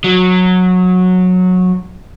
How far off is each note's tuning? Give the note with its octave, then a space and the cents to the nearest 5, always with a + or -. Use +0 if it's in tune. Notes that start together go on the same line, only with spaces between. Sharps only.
F#3 -15